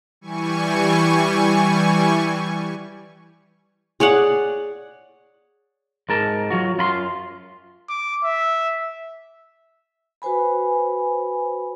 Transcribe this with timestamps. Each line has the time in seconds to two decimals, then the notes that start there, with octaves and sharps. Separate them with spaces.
0.21 E3 G3 G#5 C#6
4.00 G#4 C#5 D5 F#5
6.09 G#2 A#4 A5
6.50 F#3 F4 F#4
6.78 F#2 F4 B5 C6
7.89 D6
8.24 E5
10.22 F#4 B4 C5 G#5 B5